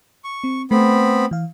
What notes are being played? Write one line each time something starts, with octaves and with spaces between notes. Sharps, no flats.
C#6
C4
A3 B3 C4 B5
E3 F5